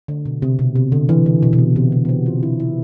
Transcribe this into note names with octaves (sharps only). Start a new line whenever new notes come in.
D3
B2
C3
B2
C3
D3
E3
D3
B2
B2
C3
C3
D3
B3
C4
F4
E4
E4